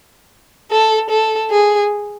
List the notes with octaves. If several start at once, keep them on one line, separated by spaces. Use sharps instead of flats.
A4
A4
G#4